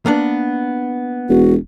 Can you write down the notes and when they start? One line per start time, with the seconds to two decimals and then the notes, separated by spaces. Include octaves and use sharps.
0.06 A#3 B3 D4
1.29 E1 F#4